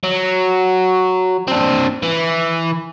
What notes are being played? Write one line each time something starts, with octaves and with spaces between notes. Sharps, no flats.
F#3
C4 D4
E3